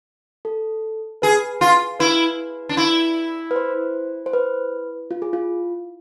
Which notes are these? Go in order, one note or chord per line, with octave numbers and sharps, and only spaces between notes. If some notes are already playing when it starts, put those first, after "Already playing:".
A4
G#4 B4
F4
E4 B4
D4
E4
B4
C5
C5
B4
F4
G#4
F4